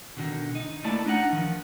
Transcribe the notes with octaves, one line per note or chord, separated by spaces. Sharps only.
B2 D3 D#3
D#4
A3 A#3 E4 D5 A5
D4 D#4 F#5
D#3 F3